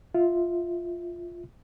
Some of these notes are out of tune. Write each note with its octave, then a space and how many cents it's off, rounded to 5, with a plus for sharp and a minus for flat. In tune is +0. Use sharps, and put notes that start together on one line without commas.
F4 +0 E5 -15